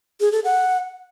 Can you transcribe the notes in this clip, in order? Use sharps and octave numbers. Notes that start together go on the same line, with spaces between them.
G#4
A4
F#5